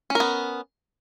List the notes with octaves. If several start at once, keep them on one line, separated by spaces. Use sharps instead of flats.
B3 C#4 A#4